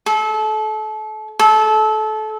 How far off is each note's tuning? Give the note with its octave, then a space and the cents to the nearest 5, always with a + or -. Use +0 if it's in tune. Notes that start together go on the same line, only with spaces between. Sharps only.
A4 -30
A4 -25